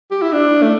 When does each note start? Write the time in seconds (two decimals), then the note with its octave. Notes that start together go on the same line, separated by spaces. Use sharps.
0.11 G4
0.22 E4
0.33 D4
0.62 A3